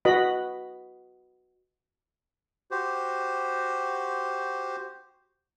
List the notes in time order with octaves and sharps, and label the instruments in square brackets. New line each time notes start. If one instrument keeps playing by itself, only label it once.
[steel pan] F#4 B4 D#5 B5
[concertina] F#4 G4 C5